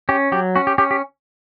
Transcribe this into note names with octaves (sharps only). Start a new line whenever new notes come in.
C#4 G4
F#3 G4
C#4 F#4
G4
C#4 G4
G4